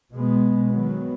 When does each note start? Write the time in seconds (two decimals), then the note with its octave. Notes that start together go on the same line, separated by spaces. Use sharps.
0.13 B2 G#3 B3
0.71 D#3 F#3 B3